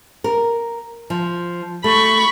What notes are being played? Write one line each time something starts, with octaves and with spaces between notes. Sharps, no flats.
A#4
F3
A3 B5 C#6